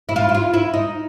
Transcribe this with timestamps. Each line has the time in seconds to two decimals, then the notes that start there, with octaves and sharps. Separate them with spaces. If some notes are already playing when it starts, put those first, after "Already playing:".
0.09 E4
0.16 F4
0.29 E4
0.35 F4
0.54 E4
0.73 D#4